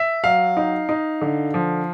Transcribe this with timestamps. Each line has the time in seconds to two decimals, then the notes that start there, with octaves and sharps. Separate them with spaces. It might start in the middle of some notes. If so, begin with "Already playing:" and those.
Already playing: E5
0.23 F#3 F5
0.57 D#4
0.89 D#4
1.21 D3
1.54 F3